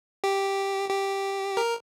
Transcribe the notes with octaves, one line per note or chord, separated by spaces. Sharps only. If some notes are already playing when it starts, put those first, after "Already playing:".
G4
G4
A#4